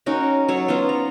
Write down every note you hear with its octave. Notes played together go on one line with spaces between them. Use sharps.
C#4 D#4 F#4 A#4
F#3 A4 C#5
B3 C#4 F4 C5
A#5